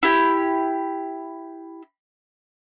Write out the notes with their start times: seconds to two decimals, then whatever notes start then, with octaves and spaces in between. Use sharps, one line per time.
0.03 E4 G4